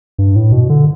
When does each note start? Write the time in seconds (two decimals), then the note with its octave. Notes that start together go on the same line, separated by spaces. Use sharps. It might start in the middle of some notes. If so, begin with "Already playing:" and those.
0.18 G2
0.36 A2
0.52 B2
0.69 D3